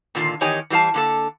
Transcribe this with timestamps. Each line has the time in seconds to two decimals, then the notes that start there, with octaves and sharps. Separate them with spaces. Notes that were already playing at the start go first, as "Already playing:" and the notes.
0.15 A#2 D3 D#3 F4
0.41 E2 D#3 G4 C#5 D#5 G#5
0.70 E3 G3 A#3 F5 A5
0.94 D3 A#3 A4